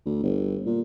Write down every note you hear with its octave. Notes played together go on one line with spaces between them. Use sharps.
D2
G1
A#2